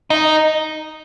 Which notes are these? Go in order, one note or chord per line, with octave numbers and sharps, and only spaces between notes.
D#4